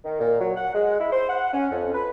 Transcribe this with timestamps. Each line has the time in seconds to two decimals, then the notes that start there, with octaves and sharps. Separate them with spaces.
0.05 D#3
0.19 A#2
0.40 F#3
0.56 F#5
0.74 G#3
1.00 E4
1.12 C5
1.29 F#5
1.53 C#4
1.71 F2
1.94 B4